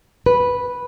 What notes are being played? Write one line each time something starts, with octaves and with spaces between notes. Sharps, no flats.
B4